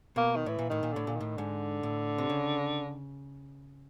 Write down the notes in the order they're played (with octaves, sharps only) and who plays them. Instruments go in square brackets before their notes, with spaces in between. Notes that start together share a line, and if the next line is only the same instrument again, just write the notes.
[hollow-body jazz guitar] B2 [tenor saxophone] A#3
[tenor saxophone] D#3
[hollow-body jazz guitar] A2 [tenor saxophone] E3
[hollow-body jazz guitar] A#2
[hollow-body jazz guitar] A2 [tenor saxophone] D#3
[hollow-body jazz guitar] A#2
[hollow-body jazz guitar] A2 [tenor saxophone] D3
[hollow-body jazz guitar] A#2
[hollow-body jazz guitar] A2 [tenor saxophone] D#3
[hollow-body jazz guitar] G#2 [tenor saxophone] D3
[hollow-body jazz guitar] A2
C3
C#3